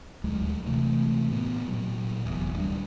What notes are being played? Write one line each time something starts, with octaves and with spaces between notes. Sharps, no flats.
D#1 D2 F#3 G#3
C3 E3 A3
A2 B3
A#2 F#3
F1 E2
D1 G3 D4